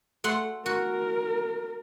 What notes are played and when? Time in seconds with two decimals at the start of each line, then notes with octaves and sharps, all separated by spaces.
0.24 A3 F#5 C6
0.66 F#4 A#4